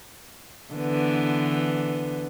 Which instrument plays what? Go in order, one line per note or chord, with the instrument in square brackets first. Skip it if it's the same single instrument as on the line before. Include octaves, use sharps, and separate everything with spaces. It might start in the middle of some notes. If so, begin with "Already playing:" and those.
[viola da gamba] D3 E3 B3